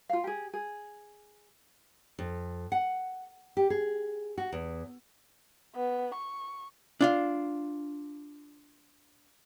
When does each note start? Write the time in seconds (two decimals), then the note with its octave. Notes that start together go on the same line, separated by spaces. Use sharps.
0.09 F4 F5
0.24 G4 G#4
0.53 G#4
2.19 F2
2.72 F#5
3.57 G4
3.70 G#4
4.38 F#4
4.52 E2
5.75 B3
6.15 C#6
7.01 D4 F4 F5